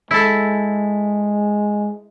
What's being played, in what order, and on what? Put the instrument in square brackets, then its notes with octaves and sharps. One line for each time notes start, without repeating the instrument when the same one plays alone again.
[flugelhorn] G#3 [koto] E4 A4